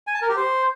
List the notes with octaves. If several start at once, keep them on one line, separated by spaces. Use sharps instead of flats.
G#5
A5
A#4
G4
C5